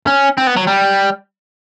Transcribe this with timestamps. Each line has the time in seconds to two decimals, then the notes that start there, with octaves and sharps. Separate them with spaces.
0.07 C#4
0.38 C4
0.47 B3
0.57 F#3
0.67 G3